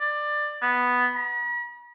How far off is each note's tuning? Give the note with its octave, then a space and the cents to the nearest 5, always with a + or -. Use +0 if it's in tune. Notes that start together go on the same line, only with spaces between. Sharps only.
D5 +15
B3 +0
B5 -45